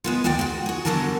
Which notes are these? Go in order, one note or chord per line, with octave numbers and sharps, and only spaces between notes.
G#3 B3 F4
D2 G#3 A#3 D5 G5
G#2 F#4
F#4 G#4
E2 D3 F#3 G3 A#4 A5